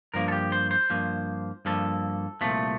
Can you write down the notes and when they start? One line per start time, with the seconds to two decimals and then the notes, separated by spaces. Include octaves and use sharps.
0.14 G2 F3 A#3 A#4
0.28 A4
0.32 G4
0.52 C5
0.71 C5
0.90 G2 F3 A#3
1.65 G2 F3 A#3 A4
2.41 C2 A#2 F3 A3